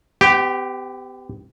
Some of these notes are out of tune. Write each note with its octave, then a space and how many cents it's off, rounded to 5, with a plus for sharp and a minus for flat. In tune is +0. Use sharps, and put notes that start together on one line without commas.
B3 +40 G4 +0